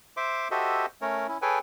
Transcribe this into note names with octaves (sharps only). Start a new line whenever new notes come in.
C5 E5 C6 D6
F#4 G4 A4 C5 D#5 E5
A3 C#4 A#4 C#5
C#4 E4
G#4 A4 B4 C#5 G5 G#5